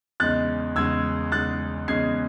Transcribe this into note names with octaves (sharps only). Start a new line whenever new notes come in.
E2 C#3 G#3 D#4 F#6 A6
E2 C#3 G#3 D#4 E6 G#6
E2 C#3 G#3 D#4 F#6 A6
E2 C#3 G#3 D#4 G#6 C7